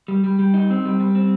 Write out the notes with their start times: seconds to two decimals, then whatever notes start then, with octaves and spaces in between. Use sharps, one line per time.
0.08 G3
0.24 G3
0.39 G3
0.54 D#4
0.70 C4
0.85 G3
1.00 G3
1.15 C4